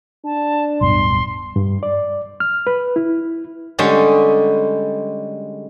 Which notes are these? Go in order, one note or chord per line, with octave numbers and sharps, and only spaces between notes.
D4 A5
D1 G2 B2 C6
G2
D5
F6
B4
E4
D3 G3 G#3 C#4 G4